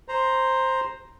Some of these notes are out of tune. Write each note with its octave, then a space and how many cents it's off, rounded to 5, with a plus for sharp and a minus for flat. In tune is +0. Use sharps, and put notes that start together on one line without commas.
C5 +5 A#5 +0